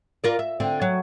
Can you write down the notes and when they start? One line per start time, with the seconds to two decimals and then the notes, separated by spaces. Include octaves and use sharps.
0.24 F4 A#4 D5
0.39 E5
0.60 D3 C4
0.82 F#3